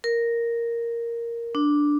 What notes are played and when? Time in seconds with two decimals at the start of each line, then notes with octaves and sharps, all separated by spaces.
0.04 A#4
1.55 D4